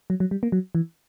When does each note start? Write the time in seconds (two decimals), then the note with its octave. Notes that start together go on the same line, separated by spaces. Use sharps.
0.10 F#3
0.20 F#3
0.31 G3
0.43 A#3
0.52 F#3
0.75 E3